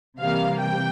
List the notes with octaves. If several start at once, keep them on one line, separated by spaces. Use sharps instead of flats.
C3 E3 G3 A#3 F5
G5